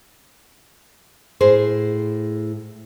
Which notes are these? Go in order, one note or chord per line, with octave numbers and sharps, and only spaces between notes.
A2 G#4 C5